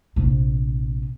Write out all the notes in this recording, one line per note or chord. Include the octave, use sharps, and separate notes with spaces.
A#1 C3